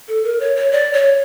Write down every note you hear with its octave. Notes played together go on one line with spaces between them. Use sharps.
A4
A#4
C#5
C#5
D5
C#5